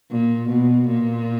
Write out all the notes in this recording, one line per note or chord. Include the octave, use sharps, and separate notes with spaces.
A#2
B2
A#2